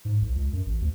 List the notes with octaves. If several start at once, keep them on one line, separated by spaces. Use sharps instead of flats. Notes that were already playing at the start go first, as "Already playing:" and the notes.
G#2
B1
C#2
F#2
A1
D2